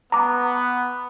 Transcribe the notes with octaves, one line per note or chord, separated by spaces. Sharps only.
B3 A#5 D6